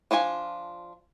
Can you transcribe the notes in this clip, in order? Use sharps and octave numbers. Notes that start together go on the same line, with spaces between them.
F3 D4 F4 G#5